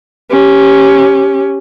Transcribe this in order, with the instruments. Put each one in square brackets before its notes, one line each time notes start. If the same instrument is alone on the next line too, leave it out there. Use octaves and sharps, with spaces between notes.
[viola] C#4 G4